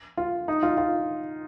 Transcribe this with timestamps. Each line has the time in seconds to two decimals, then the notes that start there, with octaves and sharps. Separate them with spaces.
0.17 F4
0.48 D#4
0.63 F4
0.77 F4